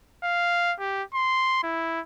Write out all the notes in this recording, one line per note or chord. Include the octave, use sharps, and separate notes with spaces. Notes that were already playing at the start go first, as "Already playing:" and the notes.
F5
G4
C6
E4